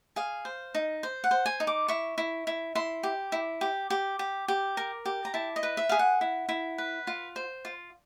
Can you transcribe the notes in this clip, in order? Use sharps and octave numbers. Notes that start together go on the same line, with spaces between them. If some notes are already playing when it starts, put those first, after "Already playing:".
G#4 F5
C5
D#4
C5
F#5
C5
G#5
D#4
D6
E4 C#6
E4
E4
E4 C6
G4
E4
G4
G4
G4
G4
A#4
G4
A#5
E4 A5
D#5
B4
E5
G#4 F5
F#5
E4
E4
B4
F4
C5
F4